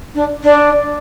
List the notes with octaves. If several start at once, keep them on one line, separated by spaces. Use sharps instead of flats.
D4
D4